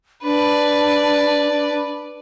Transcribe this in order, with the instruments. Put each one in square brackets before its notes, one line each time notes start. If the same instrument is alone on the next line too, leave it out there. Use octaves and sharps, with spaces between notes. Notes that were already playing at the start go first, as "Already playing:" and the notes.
[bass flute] D4 [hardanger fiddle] B4 D5